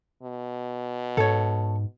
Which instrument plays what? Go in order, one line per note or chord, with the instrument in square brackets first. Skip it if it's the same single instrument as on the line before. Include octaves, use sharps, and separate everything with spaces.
[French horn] B2
[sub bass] G#2 [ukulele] A4 C#5